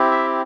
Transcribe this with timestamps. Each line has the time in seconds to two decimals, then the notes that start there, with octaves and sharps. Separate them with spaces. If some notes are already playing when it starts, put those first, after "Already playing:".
Already playing: C4 E4 G4
0.11 E5